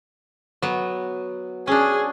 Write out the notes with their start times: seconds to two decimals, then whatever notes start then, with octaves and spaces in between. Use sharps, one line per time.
0.62 F#3 B3
1.67 C#4 D4 G#4